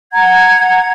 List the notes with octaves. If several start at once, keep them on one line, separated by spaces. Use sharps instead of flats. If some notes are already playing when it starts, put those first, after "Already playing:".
F#5 A#5 G#6